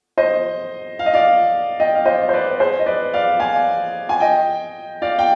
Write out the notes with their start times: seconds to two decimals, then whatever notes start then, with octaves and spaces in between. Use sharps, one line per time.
0.18 C5 D#5
0.99 F5
1.06 D#5
1.14 D5 F5
1.80 D#5 G5
1.95 F5
2.05 C5 D#5
2.29 C5
2.33 B4 D5
2.60 G#4 C5
2.80 D#5
2.86 B4 D5
3.14 D5 F5
3.40 F5 G#5
4.09 G#5
4.20 D#5 G5
5.02 D5 F5
5.19 G5